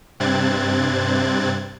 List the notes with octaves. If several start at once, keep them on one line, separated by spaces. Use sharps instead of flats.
G2 C3 C4 F#6 G#6 A6